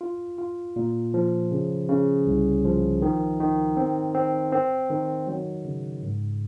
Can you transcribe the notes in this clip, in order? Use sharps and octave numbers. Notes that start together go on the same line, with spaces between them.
F4
F4
A#2
F3
C#3
C#3
C2
F3
D#3
D#3
C4
C4
C4
D#3
F#3
C#3
G#2